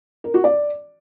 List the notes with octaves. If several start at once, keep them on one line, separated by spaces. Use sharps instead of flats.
A#4
F#4
D5